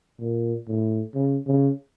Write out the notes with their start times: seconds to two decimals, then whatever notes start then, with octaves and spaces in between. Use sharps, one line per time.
0.20 A#2
0.68 A2
1.15 C#3
1.47 C#3